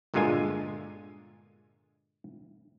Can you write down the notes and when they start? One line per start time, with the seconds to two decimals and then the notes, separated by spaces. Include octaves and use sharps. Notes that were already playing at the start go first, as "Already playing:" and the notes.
0.14 G1 A#2 D3 G#3 F4 G#5